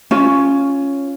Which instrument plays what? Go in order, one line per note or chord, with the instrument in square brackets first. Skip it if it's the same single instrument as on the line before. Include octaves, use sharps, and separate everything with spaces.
[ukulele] C#4 F4